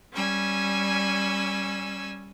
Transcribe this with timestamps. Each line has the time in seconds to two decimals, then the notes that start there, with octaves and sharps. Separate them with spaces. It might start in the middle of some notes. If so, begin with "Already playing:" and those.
0.13 G3 C#4 G#5 E6